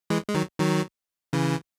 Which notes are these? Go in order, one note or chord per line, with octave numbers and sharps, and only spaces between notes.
E3 G#3
G#3
D#3 F#3
D#3 F#3
C#3 E3